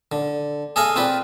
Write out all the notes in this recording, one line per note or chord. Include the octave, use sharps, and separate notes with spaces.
D3
G#4 A4 D#5 F5 G#5
C4 F4 B4 D5